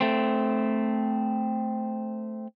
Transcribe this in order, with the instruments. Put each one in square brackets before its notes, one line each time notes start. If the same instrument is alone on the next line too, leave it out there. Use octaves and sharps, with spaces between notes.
[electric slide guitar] A3 C4